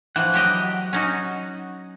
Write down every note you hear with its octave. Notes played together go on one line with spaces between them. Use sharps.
E3 F3 F#5
F#3 G4 D#5
C#4 D#4 F#4